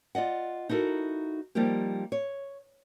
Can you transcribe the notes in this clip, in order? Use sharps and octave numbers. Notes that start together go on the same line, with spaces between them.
F4 D5 D#5 F#5
D#4 E4 F#4 A4 A#4
F3 G3 A#3 D#4 F4 G4
C#5